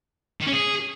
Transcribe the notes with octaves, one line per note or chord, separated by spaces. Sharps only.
D#3
C#4
G#4